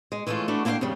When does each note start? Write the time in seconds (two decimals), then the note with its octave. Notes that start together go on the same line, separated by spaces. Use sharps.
0.12 G#3
0.27 E3 G#3 A3 C#4 F4
0.48 A3 D4 E4 F#4
0.65 A#3 D4 E4 G#4 F5 G5
0.81 F2 C#3 G3